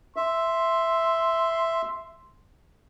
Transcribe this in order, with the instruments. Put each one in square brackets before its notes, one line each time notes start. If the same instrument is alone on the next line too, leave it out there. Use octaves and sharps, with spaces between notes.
[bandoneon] E5 [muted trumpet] C6